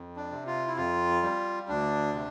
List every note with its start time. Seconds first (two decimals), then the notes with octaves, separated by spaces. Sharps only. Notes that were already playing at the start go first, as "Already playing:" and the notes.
Already playing: F2
0.16 D4
0.31 C3
0.46 F4
0.67 E4
0.77 F2 F4
1.23 G3
1.69 D2 D4
2.14 C3